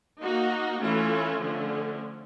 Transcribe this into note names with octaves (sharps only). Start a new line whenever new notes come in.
A#3 D#4 F#4
E3 A3 C#4 F4
D3 F3 A3 C#4